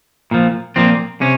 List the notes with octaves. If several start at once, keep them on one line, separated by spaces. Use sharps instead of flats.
A#2 F3
A#2 F3 C4
C3 C#4